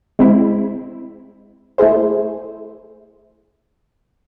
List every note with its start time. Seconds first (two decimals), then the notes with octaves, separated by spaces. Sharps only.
0.19 G#3 C4 E4
1.78 A3 E4 G#4 C5